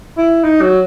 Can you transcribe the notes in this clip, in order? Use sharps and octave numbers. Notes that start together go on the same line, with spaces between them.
E4
D#4
F#3